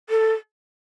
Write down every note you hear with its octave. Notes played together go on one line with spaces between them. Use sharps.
A4